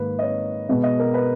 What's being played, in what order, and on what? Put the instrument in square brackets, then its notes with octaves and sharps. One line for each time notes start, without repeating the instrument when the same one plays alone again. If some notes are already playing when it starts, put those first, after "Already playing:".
Already playing: [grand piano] G#2 D#3 A#3 B4
D#5
C#5
B2 G#3 B3 D#5
D#5
A#4
B4